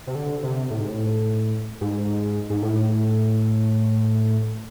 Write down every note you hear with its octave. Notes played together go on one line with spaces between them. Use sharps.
C3
D3
C3
A2
G#2
A2
G#2
G#2
A2